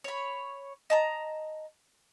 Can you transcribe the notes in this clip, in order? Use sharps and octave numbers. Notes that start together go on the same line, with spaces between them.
C#5 B5
D#5 A5 A#5